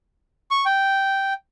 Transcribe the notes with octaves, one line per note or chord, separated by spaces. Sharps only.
C#6
G5